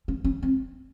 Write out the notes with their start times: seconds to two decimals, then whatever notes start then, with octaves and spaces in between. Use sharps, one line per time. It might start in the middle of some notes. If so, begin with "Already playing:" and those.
0.08 C#4
0.24 C#4
0.43 C4